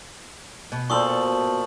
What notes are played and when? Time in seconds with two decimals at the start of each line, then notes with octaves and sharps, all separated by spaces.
0.72 B2
0.90 A#2 A4 C5 C#6 D#6 F#7